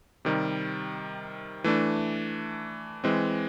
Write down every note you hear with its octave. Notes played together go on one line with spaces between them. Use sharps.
C3 D#3 G3
E3 A3 D4
E3 G#3 C4